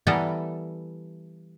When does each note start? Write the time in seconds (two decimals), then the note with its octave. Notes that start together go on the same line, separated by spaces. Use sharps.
0.07 E3 G3 B3 A4 A#4